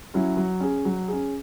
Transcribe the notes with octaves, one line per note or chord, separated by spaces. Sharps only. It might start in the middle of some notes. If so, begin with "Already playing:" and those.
F#3 C#4 E4
F#3
C#4 G#4
F#3
C#4 G#4